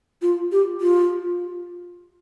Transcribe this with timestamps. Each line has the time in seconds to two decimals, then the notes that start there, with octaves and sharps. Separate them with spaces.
0.22 F4
0.52 G4
0.81 F4